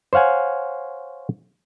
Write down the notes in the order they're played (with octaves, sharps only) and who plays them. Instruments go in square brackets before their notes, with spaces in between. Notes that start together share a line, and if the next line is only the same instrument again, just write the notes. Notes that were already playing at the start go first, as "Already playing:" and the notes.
[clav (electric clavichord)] C5 C#5 F5 F#5 G#5